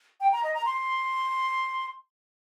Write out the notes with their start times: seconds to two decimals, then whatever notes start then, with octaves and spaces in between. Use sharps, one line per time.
0.21 G5
0.32 A#5
0.44 D#5
0.54 A#5
0.66 C6